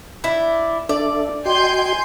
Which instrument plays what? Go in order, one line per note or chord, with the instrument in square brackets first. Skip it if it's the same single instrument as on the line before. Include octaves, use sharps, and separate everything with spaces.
[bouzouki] D4 E4
[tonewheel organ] D4 A4 E5 [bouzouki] D5
[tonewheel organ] F#4 D#5 G5 [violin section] G#5 C6 G6